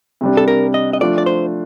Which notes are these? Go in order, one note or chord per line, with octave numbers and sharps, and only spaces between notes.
C3 G3 D4
A4
A#4
D#5
D#5
F3 A3 D4 F4 D5
D5
C5